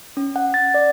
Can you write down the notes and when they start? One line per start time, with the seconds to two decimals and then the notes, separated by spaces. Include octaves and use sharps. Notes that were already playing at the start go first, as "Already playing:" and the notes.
0.17 C#4
0.36 F#5
0.54 A6
0.74 D5